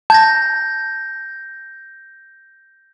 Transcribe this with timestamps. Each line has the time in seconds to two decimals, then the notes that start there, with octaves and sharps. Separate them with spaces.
0.10 A5 G6 G#6 A#6